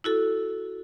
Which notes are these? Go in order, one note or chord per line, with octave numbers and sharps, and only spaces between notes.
E4 F#4 A4